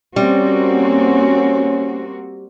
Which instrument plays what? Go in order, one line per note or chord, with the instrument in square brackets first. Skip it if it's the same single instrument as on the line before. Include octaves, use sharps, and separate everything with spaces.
[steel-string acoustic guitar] G3 [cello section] A#3 C4 F#4 [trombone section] C#4